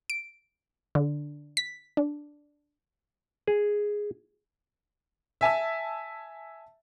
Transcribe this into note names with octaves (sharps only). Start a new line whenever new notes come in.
D7
D3
B6
D4
G#4
E5 G#5 A5 E6